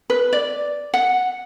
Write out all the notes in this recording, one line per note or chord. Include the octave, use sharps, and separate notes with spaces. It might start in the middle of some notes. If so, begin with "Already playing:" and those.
B4
D5
F#5